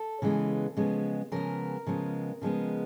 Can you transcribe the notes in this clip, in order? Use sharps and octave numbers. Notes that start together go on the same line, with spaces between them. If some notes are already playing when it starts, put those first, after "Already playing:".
Already playing: A4
C#3 E3 G#3 B3
C#3 F3 G#3 B3
C#3 F3 G#3 B3 A#4
C#3 F3 G#3 B3
C#3 F3 G#3 B3